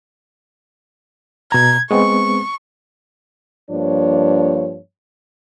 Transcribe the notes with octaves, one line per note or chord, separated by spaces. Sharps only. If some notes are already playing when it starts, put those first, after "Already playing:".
B2 A#5 G#6
G#3 B3 C4 C#6
G2 F3 A#3 D4 C#5